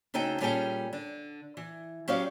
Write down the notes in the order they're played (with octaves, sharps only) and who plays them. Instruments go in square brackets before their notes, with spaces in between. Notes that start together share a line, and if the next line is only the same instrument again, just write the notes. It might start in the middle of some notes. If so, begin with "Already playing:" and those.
[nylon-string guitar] D2 C#3 D#4 A4 G5
A#2 G3 C#4 G#4 A4 G5
D3
E3
F#3 C#4 G4 C#5 D5 F5